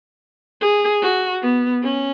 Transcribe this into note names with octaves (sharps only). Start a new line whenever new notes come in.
G#4
F#4
B3
C#4